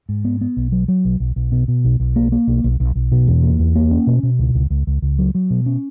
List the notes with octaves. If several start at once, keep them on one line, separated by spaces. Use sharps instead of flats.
G#2
B3
B3
B1
F#3
F#3
B1
B1
B1
B2
B2
B1
B1
A#3
A#3
B1
B1
B1
B1
B2
E2
A#3
E2
A#3
C#4
B2
B2
C#2
C#2
C#2
C#2
C#2
F#3
F#3
B2
C#4